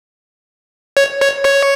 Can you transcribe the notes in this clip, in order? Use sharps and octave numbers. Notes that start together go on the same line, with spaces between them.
C#5
C#5
C#5